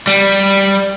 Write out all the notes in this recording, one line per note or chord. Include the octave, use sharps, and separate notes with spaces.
G3